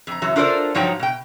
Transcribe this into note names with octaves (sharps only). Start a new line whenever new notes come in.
F2 A#5
F#2 E3 F#3
D4 F4 A4 A#4 C5 D5
G2 F3 F#3 D#4 C#5 G5
B2 G5